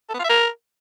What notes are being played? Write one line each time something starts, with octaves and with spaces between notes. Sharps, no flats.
A4
B3
F4
E5
A#4